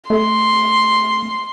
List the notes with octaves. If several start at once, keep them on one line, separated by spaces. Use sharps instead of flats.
A3 C6